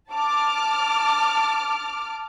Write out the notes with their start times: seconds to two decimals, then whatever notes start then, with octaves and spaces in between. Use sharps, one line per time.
0.11 A5 D6 F6